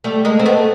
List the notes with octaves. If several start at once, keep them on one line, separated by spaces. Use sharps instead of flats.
G3 A3
G#3 A#3
C4
A3 B3